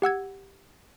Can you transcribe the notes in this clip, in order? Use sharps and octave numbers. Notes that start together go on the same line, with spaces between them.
G4 F#5 E6 G#6